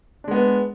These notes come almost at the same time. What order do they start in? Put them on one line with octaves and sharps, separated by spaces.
D4 G#3 B3